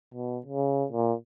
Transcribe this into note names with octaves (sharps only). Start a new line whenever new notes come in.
B2
C#3
A#2